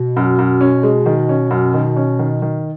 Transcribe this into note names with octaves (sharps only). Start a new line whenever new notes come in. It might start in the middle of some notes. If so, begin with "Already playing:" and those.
Already playing: B2
F#2
F#2
C#4
G#3
D#3
C#4
F#2
D#3
C#4
D#3
D#3